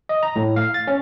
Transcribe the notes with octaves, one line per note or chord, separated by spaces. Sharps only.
D#5
A#5
A2
F5
A6
C#4